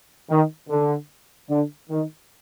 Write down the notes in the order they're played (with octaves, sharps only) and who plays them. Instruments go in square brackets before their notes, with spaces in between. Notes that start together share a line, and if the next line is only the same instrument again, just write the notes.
[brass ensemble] D#3
D3
D3
D#3